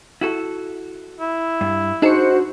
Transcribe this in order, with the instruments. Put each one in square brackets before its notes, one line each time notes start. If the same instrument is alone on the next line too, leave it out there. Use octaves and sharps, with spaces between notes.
[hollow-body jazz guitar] E4 F#4 A4
[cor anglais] E4
[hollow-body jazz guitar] G2
[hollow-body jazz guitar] D4 G#4 A5 [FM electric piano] D#4 C#7 [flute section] F#4 C5